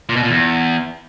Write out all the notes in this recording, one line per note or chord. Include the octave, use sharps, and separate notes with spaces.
A#2
B2
A#2
E2